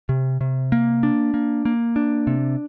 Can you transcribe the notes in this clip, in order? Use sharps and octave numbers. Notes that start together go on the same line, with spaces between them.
C3
C3
A#3
D4
A#3
A#3
D4
C3